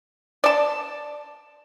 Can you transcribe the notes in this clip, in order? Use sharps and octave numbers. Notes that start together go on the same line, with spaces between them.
D5 A5